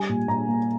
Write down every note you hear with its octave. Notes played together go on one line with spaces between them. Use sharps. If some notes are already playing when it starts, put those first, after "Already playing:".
Already playing: G3 G#5
A#2
A#2 A#5
A#3